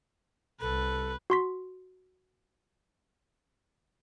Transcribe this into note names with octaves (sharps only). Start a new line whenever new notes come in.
C2 A4 B4
F#4 C6 B6